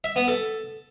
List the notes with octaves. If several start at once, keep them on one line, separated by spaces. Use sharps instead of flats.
E5
B3
A4